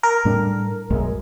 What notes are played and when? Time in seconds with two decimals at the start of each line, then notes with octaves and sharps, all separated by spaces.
0.03 A#4
0.25 A2 G3 D4
0.90 B1 F#2 G#3